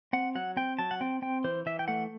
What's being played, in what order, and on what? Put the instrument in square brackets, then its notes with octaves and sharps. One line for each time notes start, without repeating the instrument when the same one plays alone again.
[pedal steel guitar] C4 F#5
F#3 F#5
C4 G5
F#3 A5
F#5
C4 G5
C4 G5
E3 C5
E3 E5
G5
A3 F#5